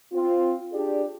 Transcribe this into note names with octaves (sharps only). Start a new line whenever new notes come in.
C4 F4
D4 G4 G#4 D5